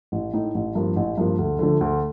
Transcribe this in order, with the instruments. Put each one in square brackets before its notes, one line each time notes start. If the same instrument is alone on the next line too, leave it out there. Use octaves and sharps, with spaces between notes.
[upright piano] A1
A2 A3 D#4
A1
G2 F3 A#3
A1
G2 F3 A#3
D2
D3 F3 A3 D4
D2